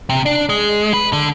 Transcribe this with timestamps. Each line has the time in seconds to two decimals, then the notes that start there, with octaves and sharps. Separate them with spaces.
0.09 C3
0.26 D4
0.49 G#3
0.94 B4
1.13 D3